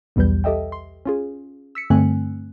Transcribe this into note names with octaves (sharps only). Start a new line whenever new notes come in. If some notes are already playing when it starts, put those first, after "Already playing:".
B1 E2 G3 B4 G6
G4 A4 D#5 E5 G5
C6
C#4 F4 G#4
E6 B6 C#7
G2 D3 A3 C4 G#5 F#6